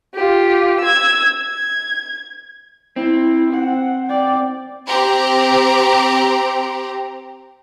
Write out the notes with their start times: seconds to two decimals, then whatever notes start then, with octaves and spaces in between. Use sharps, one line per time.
0.14 F4 G4
0.80 E6 G#6
1.36 G#6
2.96 C4 E4
3.53 F#5
4.06 D5 G5
4.87 C4 G4 A#5